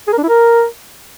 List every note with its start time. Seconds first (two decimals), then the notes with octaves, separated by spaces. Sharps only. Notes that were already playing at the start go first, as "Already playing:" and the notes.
0.08 G#4
0.13 A#4
0.18 D4
0.23 E4
0.29 A#4